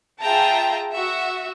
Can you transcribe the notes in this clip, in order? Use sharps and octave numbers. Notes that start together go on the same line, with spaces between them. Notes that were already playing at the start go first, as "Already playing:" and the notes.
F4 G#4 E5 G5 A5 A#5
F#4 E5